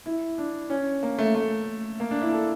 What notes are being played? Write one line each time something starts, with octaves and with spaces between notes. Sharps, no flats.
E4
D4
C#4
A#3
A3
A3
A#3
D4
E4
A4